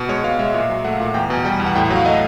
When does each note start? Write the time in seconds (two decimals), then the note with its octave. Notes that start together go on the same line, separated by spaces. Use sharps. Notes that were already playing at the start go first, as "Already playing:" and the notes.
Already playing: B2
0.09 G#3 C#5
0.24 B2 F5
0.39 G#3 E5
0.54 A#2 E5
0.69 F#3
0.84 A3 F#5
0.92 F5
1.00 A#2 F#5
1.14 E2 G5
1.30 B2 G#5
1.45 G3 G5
1.60 E2
1.66 F#5
1.75 A2 G5
1.85 F#5
1.90 F#3
1.96 F5
2.05 A3 D#5